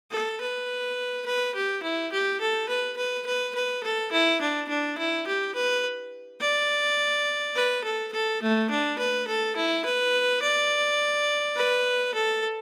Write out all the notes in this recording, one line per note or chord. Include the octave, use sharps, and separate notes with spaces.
A4
B4
B4
G4
E4
G4
A4
B4
B4
B4
B4
A4
E4
D4
D4
E4
G4
B4
D5
B4
A4
A4
A3
D4
B4
A4
E4
B4
D5
B4
A4